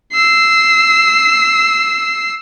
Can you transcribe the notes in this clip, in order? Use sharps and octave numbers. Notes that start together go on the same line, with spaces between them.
E6 C7